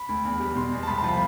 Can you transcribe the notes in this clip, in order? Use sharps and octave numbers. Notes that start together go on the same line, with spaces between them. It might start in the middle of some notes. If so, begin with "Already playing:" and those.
Already playing: B5
D2
E2
G3
B2 C6
E2
A5
C2 B5
A5
F3
B5